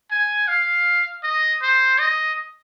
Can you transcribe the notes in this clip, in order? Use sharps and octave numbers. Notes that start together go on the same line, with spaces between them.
G#5
F5
D#5
C5
D#5